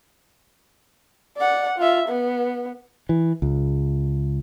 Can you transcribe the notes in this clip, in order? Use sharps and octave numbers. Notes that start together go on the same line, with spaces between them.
D5 F#5
F4 E5
B3
E3
C#2